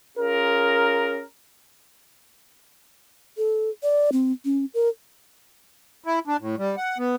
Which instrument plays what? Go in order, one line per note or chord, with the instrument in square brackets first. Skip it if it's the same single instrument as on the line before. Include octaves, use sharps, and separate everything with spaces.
[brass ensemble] C#4 F4 G#4 A#4
[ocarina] A4
D5
C4
C#4
A#4
[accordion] E4
D4
A2
G3
F#5
B3